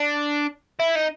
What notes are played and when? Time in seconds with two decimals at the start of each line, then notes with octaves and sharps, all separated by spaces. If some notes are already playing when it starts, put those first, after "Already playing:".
Already playing: D4
0.79 E4
0.96 D#4